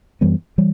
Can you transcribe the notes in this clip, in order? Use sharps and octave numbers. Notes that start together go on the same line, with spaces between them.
F#2 E3 G3 B3
E3 G3